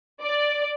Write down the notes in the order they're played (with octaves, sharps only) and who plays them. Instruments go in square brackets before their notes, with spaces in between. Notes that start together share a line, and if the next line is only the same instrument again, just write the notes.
[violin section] D5